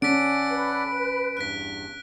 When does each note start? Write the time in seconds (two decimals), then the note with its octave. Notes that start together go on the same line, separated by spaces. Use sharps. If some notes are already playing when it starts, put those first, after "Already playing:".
0.02 C#4 A4 D5 F#5 B6 D7
0.49 B4
1.37 E2 G2 F#6 B6